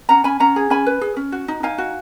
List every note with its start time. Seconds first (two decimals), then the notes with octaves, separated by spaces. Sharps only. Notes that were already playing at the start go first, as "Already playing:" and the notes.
0.09 C#4 F#5 A#5
0.24 C#4 G#5 B5
0.40 C#4 F#5 A#5
0.56 G#4
0.70 C#4 G#5 B5
0.86 B4
1.01 G#4
1.16 C#4
1.32 F#4
1.48 D#4
1.63 D#4 F5 G#5
1.78 F#4